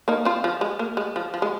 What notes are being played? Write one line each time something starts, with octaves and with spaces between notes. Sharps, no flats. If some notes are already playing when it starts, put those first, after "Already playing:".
A#3 D#4
C4 F4
F3
G#3
A#3
G#3
F3
F3
G#3